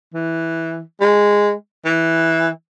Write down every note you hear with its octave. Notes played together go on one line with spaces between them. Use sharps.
E3
G#3
E3